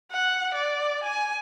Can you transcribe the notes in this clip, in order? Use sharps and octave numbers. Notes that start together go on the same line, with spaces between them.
F#5
D5
G#5